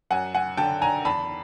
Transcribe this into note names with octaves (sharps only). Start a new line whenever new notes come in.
F#2 F#5 G#5
F#5 G#5
D3 G5 A5
G#5 A#5
E2 A5 B5